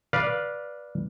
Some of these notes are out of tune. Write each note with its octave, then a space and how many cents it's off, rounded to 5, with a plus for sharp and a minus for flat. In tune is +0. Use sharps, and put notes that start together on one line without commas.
B4 -15 D5 +0 F5 +0